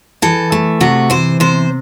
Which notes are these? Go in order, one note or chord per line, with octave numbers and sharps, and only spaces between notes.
E3 A4
A3
C3 F#4
E3 C5
C3 C5